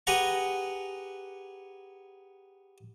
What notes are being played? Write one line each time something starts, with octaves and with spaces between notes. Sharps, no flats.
G4 G#4 B4 F#5 A#5 C#6